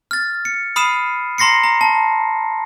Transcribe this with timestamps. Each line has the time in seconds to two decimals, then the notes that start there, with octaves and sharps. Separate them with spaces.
0.11 F6 A6
0.45 C#7
0.76 B5 D#6 F6 C7 D#7 E7
1.38 A#5 C6 A#6 C7 C#7
1.63 A#5
1.81 A5